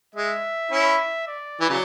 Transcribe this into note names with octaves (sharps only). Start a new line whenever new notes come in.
G#3 E5
C#4 E4
D5
E3
C#3 F#3